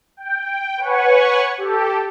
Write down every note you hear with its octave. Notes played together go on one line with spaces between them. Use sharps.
G5
B4 C#5 F#5 G#5 C#6
G4 A4